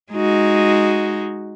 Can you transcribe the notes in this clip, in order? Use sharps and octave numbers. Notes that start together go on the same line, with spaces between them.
G#3 D#4 F#4